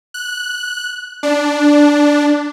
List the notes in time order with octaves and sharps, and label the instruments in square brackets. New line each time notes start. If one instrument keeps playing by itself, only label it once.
[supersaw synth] F#6
D4